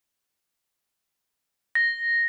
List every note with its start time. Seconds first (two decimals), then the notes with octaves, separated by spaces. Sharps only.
1.75 A#6